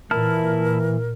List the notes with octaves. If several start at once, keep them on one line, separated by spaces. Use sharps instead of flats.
A#2 E3 E4 A#4 A5 F6